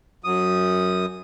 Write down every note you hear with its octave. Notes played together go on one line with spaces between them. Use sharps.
F#2 D#6